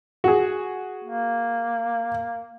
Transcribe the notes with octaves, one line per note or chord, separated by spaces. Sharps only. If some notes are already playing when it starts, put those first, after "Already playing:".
F#4 G#4
A#3